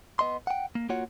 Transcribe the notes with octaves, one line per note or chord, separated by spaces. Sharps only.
B3 D#5 C6
F#5 G5
A#3
A#3 F4 F#4 C#5 F#5